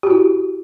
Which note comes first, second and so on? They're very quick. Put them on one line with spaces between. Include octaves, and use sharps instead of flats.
G4 F#4 E4